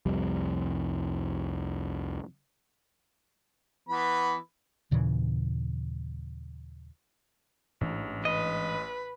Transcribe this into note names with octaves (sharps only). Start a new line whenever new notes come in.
C2 F2 G3
E3 B3 B5
D#2 A#2 C#3 E3
A1 G#2 E3 D4
B4 D#5